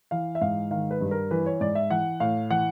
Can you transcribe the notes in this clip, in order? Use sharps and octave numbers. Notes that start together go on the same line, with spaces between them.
E3 F5
E5
G#2 F5
D#3 F5
B4
G2
A#4
E3 B4
C#5
G#2 D5
E5
E3 F#5
A2 F5
E3 F#5